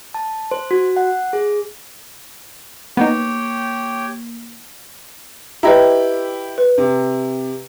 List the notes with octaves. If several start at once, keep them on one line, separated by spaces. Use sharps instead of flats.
A5
C5
F#4
F#5
G#4
A#3 B3 D#4 G4 C#5 G5
E4 G4 B4 D#5 A#5
B4
C3